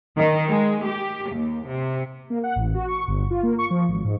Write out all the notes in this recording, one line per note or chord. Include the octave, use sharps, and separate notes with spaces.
D#3
G#3
G4
D#2
C3
A#3
F#5
A1
F#4
C#6
G1
F4
A#3
C#6
F3
G#1
G#2